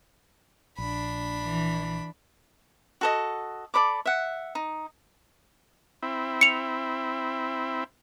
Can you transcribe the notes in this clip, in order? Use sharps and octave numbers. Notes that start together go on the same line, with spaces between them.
A#1 D4 B5
E3
F#4 A4 D#5
A4 D5 B5 D6
E5 F#5
D#4
C4 E4
C#7 F7